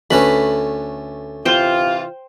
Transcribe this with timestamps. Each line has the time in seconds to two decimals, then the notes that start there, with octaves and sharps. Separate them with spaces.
0.11 D2 A3 C#4 B4 B5
1.45 C3 E3 F4 C5 G5